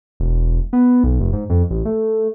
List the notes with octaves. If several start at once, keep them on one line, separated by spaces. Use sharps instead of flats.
E1
B3
B1
F1
G#2
F2
A1
A3